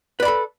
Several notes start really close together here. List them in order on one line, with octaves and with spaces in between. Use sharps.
B4 D5 B5 A4